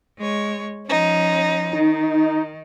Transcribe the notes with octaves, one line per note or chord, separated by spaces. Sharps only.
G#3 C#5
F3 C#4 D#4
D#3 D#4